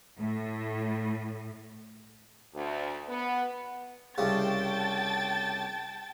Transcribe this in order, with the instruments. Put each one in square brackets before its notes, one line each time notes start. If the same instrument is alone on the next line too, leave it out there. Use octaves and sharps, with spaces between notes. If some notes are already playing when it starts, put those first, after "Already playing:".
[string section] A2
[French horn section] D2
B3
[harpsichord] C2 C#3 [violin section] G5 A5 A6